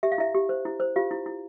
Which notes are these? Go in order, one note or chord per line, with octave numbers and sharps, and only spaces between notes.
G4 E5
F5
E4 E5
G4
C5
E4
C5
F4 G4 F5
E4
E4